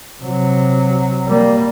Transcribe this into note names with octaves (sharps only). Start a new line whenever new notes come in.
C3 F#3
G3 A#3